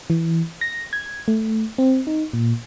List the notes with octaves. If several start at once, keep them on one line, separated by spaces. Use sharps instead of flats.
E3
A#6
G#6
A3
C4
D#4
A#2